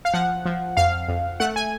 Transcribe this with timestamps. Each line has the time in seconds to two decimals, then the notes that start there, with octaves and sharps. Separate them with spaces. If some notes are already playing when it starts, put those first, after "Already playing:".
0.05 F5
0.14 F3 F#5
0.45 F3
0.77 F2 F5
1.08 F2
1.40 A3 F#5
1.56 G#5